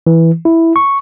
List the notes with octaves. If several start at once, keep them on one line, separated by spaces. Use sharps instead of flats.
E3
E4
C#6